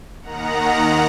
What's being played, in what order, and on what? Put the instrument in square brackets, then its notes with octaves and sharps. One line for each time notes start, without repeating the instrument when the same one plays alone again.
[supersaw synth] D#2 D#3 F#5 A#5